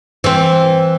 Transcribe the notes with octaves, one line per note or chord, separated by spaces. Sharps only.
E3 C4